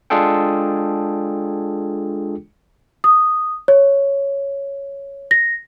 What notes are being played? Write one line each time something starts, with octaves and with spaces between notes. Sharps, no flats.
G#3 D4 F4 G#4 A4 G5
D#6
C#5
A#6